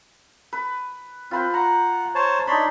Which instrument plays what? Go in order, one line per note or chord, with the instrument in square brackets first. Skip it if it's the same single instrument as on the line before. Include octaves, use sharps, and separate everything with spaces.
[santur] B4
[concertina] C4 [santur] F4 B4 C5
[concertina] F#5 [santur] A#5
[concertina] C5 C#5 A5
[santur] D4 D#4 [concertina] C#5 B5 C6